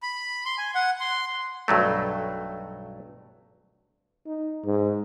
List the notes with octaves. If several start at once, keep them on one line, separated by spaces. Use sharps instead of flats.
B5
C6
G#5
F#5
C6
B1 G2 F#3 A3
D#4
G#2